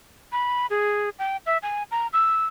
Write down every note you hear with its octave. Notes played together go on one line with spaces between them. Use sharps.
B5
G#4
G5
E5
G#5
A#5
E6